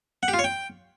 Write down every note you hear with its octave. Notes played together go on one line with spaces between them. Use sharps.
F#5
G4
F4
C#5
G5